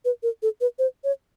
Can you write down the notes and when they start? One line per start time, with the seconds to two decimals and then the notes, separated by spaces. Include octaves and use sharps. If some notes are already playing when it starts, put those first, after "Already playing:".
0.05 B4
0.23 A#4
0.42 A4
0.61 B4
0.79 C5
1.04 C#5